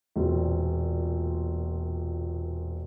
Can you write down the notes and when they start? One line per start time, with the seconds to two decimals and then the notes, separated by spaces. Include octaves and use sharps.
0.16 E1 A#2 C4